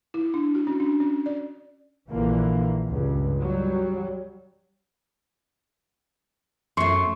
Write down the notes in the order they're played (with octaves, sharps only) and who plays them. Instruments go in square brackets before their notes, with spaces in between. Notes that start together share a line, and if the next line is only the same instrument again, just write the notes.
[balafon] E4
D4
F#4
C#4
D4
C#4
D5
[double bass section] A#1 D3 E3 A#3
C#2 G2
F#3 G3
[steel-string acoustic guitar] F#2 A3 [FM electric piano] C6 C#6